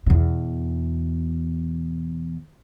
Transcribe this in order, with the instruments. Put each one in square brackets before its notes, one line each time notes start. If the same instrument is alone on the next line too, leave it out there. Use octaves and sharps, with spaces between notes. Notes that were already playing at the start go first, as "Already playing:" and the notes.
[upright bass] E2 B2